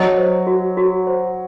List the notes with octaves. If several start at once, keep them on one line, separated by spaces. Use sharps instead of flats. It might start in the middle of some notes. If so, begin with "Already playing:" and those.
Already playing: F#3 D#5
C5
F#4
F#4
C5